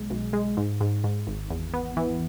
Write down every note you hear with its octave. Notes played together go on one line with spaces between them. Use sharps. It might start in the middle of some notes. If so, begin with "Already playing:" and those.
Already playing: B1 G#3
B1
G#3
G#2
G#2
G#2
G#1
E2
B3
E3